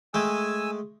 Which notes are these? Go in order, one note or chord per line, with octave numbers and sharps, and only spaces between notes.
G#3 A3 G5 G#5 E6